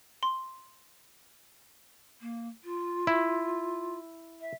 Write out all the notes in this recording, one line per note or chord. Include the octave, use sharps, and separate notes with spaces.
C6
A#3
F4
E4
E5